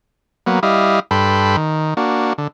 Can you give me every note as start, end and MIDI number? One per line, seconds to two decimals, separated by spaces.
0.47 0.60 54
0.47 0.60 58
0.47 0.60 59
0.63 1.00 55
0.63 1.00 64
0.63 1.00 75
0.63 1.00 77
1.11 1.56 43
1.11 1.56 69
1.11 1.56 71
1.11 1.56 79
1.11 1.56 83
1.11 1.56 84
1.57 1.94 51
1.97 2.33 58
1.97 2.33 62
1.97 2.33 66
2.38 2.47 50